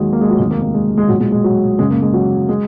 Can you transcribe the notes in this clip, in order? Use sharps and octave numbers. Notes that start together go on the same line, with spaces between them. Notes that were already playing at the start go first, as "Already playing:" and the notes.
Already playing: D#2 D#3 F#3 G#3
A#3
G#3
F#3
F1 D#2 D#3 G#3
A#3
A#3
G#3
G#3
B1 A#2 F#3
G#3
G#3
F#3
F#1 F#2 C#3 G#3
A#3
G#3
F#3
G#3